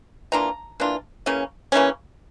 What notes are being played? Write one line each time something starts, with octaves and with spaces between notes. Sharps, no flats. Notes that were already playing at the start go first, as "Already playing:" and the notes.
E3 A#3 D4 F4 A#5
E3 A#3 D4 F4
C#3 E3 A#3 C#4
C#3 E3 A#3 C#4